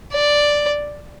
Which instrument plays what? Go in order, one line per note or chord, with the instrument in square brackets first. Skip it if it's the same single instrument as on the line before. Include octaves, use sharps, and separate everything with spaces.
[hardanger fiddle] D5